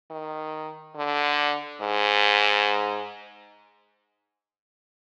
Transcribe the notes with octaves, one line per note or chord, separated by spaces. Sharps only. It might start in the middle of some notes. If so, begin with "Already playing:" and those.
D#3
D3
G#2